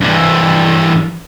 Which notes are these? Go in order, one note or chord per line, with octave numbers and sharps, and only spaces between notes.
G2 E3